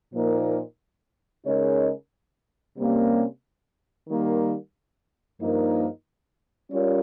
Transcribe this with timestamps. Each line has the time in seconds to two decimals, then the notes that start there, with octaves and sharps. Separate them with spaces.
0.14 A#2 F3 A#3 D#4 A#4
1.45 C#3 G#3 D#4 A#4 C#5
2.77 C3 G3 A#3 C#4
4.08 D#3 G3 A#3
5.40 G2 F3 A#3 D#4 A#4
6.71 G3 C#4 F4 A#4 C#5